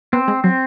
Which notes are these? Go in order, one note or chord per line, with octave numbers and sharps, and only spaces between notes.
B3 C4
G#3
F#3 C4